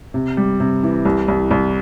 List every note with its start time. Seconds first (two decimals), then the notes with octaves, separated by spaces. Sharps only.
0.14 C3
0.37 G3
0.60 C3
0.83 E3
1.05 C2
1.28 C2
1.51 C2